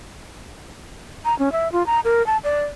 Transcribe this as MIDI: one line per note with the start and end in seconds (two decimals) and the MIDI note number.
1.25 1.37 82
1.39 1.52 61
1.52 1.71 76
1.72 1.86 65
1.86 2.00 82
2.04 2.25 70
2.27 2.37 81
2.44 2.64 74